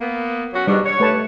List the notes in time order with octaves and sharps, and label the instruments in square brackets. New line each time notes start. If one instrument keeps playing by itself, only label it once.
[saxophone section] A#3 B3
F#3 C#4 F#4
[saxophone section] G#2 B2 D4 [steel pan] G3
[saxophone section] C#5
[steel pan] A3 B4 A5